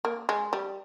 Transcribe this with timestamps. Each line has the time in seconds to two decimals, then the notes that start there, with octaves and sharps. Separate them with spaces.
0.05 A#3
0.29 G#3
0.53 G3